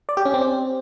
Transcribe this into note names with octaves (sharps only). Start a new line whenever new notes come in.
D5
G4
C#4
C4